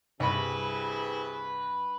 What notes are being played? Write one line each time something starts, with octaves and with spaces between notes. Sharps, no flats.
C2 G2 C3 E4 G#4 B4 B5